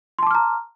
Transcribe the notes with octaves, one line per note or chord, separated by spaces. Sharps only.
A5 A#5 C6 D6 F6